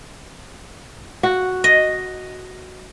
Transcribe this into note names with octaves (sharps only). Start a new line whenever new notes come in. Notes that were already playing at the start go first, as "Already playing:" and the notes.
F#4
D#5